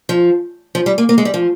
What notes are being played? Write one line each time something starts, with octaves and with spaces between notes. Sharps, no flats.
F3
F3
G3
A#3
A#3
G#3
G3
F3